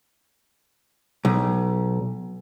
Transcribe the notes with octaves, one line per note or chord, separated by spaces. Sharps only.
B1